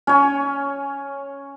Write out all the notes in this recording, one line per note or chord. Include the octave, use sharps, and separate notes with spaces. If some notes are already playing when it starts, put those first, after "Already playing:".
C#4 C#5 G#5